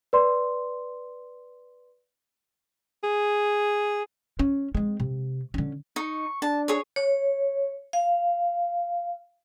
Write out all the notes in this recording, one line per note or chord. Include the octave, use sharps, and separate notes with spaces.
B4 D5 C6
G#4
C#4
G#3 C4
C3
D3 C#4
D#4 C#6
D4 A5
G#4 C#5
C#5
F5